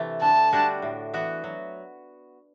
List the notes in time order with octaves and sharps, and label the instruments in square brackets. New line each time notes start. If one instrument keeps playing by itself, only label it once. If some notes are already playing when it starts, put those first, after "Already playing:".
Already playing: [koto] C3 E3 A3
[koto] D3 [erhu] A5
[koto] G3 D4 F#4
A2
E3 B3 F#4
F#3